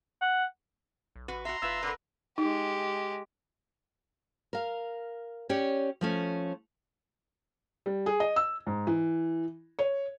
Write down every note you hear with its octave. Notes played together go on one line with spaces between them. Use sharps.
F#5
B1
A1 F#4 B4
F#4 E5 A#5 C6
F1 F4 B4 E5
D3 A#4 B4
G#3 D#4 G4
A#4 F5
C#4 G4 C#5 D5
F3 A3 C#4
G3
G#4
D#5
E6
G#2
E3
C#5